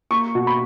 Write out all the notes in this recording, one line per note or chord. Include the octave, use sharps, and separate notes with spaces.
A#3 C#6
B2
B5